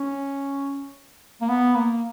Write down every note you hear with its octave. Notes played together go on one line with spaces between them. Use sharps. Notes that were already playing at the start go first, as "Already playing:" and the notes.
Already playing: C#4
A#3
B3
A#3